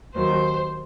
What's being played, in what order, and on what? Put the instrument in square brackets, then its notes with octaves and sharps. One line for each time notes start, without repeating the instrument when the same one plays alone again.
[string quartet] D#2 D#3 F#3 C5